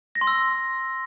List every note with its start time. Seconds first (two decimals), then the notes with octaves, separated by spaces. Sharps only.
0.15 A#6
0.21 C6
0.27 E6